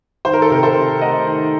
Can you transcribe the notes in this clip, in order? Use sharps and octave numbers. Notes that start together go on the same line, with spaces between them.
D#3 C5
A#4
A4
C3 A#4
A4 C5
C3
A3 D#5 F#5
D#3